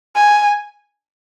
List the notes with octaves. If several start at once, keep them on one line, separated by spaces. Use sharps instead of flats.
G#5